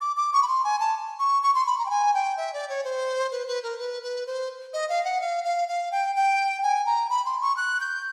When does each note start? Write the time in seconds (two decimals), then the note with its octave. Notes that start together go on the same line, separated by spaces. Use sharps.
0.01 D6
0.17 D6
0.33 C#6
0.43 B5
0.48 C6
0.64 G#5
0.80 A5
1.19 C#6
1.43 C#6
1.55 C6
1.66 B5
1.79 A#5
1.86 G5
1.90 G#5
2.14 G5
2.37 E5
2.54 D5
2.69 C#5
2.84 C5
3.32 B4
3.48 B4
3.63 A#4
3.79 B4
4.03 B4
4.27 C5
4.73 D#5
4.89 F5
5.05 F#5
5.21 F5
5.44 F5
5.68 F5
5.92 G5
6.16 G5
6.63 G#5
6.86 A#5
7.10 B5
7.26 C6
7.41 C#6
7.57 F#6
7.81 G6